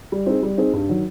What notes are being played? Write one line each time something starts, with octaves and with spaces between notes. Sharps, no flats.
G3
C4 D#4 G#4
G3
C4 D#4 G#4
G2
D#3 F#3